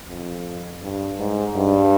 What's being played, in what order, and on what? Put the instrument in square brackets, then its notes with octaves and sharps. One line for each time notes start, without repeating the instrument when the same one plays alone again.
[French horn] F2
G2
G#2
G2